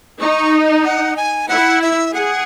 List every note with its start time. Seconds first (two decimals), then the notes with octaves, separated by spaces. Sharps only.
0.20 D#4 C#6
0.85 F#5
1.17 G#5
1.49 E4 F#5
1.82 E5
2.13 G#4 F#5